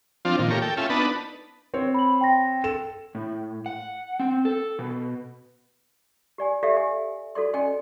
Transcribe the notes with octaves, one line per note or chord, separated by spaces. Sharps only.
F3 C4 D4 F4
A#2 D#3
A3 G4 A#4 C#5
A4 G5
C#4 F4 A4 E5
B3 D4 D#4 B4 A5
C4 C#5
B5 F#7
G5 C6 A#6
A4 E7
A2
F#5
C4
A4
B2
G4 D5 G#5
G4 A4 D5 E5 F5 G5
G4 G#5
F#4 A4 D5 C6
C#4 D5 D#5 G5 G#5 C6